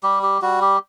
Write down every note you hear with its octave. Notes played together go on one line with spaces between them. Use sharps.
G3 G4
G4
G3 F#4
G4